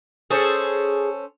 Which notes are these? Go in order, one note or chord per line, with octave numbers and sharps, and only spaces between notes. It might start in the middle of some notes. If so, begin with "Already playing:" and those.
C#4 G#4 A4 C5